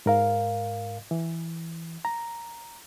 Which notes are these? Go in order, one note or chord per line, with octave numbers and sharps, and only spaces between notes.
G#2 A#4 F5
E3
A#5